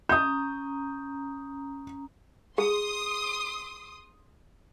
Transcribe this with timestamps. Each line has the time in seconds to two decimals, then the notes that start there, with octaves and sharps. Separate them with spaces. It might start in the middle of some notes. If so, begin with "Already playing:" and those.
0.09 C#4 A#5 D#6 G6
2.58 G#4 C6 D#6